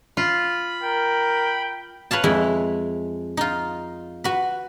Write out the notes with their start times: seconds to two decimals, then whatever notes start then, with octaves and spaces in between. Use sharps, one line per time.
0.17 F4 B5
0.83 A#4 G5
2.11 B4 C#5 F5 A5
2.24 F2 G#3 E4
3.37 D#4 F4
4.24 F#4 B4